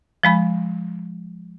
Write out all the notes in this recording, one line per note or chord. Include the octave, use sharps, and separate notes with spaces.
F3 G#3 B5